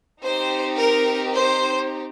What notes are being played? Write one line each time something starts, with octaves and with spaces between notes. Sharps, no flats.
C4 D#4 G4 C5
A#4
C5